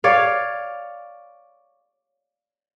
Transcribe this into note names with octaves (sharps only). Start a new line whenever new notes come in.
C#5 D5 F5